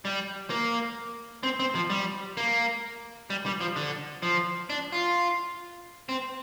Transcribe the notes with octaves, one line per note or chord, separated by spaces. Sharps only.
G3
A#3
C4
C4
F3
G3
A#3
G3
G3
F3
D3
F3
D4
F4
C4